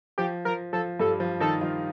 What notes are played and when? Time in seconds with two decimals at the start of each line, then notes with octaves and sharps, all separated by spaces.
0.18 F3 G4
0.45 F3 A#4
0.73 F3 A4
1.00 G2 G3 A4
1.20 F3
1.40 D#3 D#4 A4
1.61 F3 F4